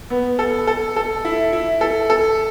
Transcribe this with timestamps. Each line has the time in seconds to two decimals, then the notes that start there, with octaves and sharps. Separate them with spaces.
0.10 B3
0.39 A4
0.67 A4
0.96 A4
1.25 E4
1.53 E4
1.81 A4
2.10 A4